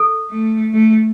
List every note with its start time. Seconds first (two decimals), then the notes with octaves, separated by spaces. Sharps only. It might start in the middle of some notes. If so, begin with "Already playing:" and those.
Already playing: A4
0.31 A3
0.73 A3